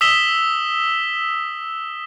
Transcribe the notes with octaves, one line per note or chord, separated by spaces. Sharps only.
D#6 E6 B6 E7 G7